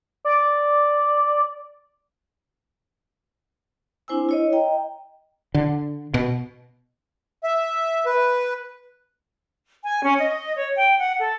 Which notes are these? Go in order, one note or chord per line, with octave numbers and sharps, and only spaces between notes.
D5
C4 D4 E4 C5 G#5 E6
E4 C#5 D#5
D#5 G5 A#5
D3
B2
E5
B4
G#5
C#4
D#5
C#5
G5
F#5
A4